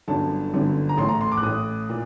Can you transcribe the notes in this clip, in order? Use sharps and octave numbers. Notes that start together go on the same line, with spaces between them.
G1 F#2 D3 A5
G1 F#2 D3
A#5
A1 A2 C6
A#5
C6
D6
F#6
A1 A2 D#6
A#2